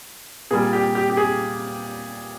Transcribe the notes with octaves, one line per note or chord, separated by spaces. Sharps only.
A#2 G3 G#4
G4
G4
G4
G#4